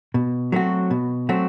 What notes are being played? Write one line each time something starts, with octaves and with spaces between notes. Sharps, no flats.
B2
F#3 A3 C4 F#4
B2
F#3 A3 C4 F#4